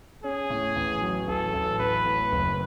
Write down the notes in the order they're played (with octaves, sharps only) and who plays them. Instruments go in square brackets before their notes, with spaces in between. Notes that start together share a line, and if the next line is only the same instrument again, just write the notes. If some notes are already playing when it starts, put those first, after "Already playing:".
[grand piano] C#4 [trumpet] G#4
[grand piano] A2
A1
F#3
[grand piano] A1 [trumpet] A4
[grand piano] A1
[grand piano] A1 [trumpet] B4
[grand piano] A2
F#1